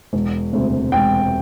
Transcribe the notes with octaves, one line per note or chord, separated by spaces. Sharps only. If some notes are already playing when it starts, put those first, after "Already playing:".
E1
D2 C3
E1 G5